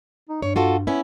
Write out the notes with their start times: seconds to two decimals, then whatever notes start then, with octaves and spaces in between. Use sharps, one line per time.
0.29 D#4
0.42 G2 C#5
0.56 F4 F#4 A4
0.87 B3 C#4 E4